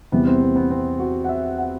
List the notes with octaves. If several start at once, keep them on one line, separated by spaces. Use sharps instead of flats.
E2 C3 E3 G3 B3
C4
B3
B3
C4
F#4
F#5
E5
F#5